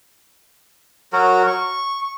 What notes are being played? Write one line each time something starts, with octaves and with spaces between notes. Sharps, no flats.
F#3 F#4 A#4
C#6